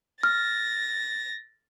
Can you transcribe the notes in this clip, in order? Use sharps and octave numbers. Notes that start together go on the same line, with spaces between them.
F6 A6 A#6